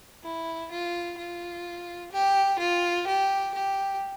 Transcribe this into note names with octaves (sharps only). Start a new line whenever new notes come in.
E4
F4
F4
G4
F4
G4
G4